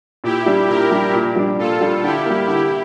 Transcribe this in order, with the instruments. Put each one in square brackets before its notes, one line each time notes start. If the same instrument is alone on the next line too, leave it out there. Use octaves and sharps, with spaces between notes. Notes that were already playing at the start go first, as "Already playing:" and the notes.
[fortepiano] A#2 [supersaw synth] E4 G4
[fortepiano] G3 D4
[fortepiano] A#2 [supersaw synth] G4 A#4
[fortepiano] G3 D4
A#2
G3 D4
[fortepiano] A#2 [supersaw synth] F4 A4
[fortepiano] G3 D4
[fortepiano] D3 [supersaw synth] E4 G4
[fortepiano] G3 A#3
[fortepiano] D3 [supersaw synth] E4 G4